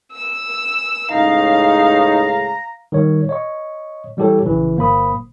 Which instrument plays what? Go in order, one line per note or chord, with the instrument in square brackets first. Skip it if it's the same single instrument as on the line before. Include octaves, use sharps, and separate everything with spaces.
[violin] E6
[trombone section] C#2 A2 C#3 [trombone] D#4 [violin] F5 [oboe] A#5
[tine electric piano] D#3 G3 C#5
C#5 D#5 C#6
E3 G3 E4 G4 A4 C#5
A#1 C#3 E3
G1 A#3 C5 B5 D#6